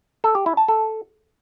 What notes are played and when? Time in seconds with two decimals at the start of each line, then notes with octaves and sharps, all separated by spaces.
0.24 A4
0.35 G4
0.46 E4
0.57 A5
0.68 A4